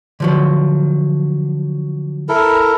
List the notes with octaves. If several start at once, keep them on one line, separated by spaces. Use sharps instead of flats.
D3 F3 F#3
E4 A4 A#4